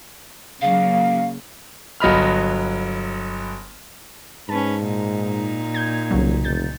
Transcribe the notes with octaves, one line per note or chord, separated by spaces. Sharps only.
C#3 F#3 A#3 F5
G1 F#3 D#5 B5 F6
G#2 C#4 B4 A5
A#2 D#4
G6 G#6
D#1 C2 C#3 F#3
F1 G6 A6